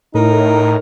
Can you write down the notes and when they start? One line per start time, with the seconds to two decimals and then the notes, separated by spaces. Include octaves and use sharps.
0.15 A2 D#4 A#4